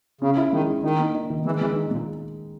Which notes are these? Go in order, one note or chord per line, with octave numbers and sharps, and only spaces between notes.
C#3 C#4
E4
D#3 G#3
E4
D#3 D#4
A#3
D#4
D#3
E3 G#3
E3 G#3
D#4
A#2 G#3